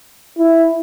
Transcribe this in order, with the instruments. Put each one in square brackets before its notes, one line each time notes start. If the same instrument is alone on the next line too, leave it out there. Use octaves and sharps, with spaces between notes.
[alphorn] E4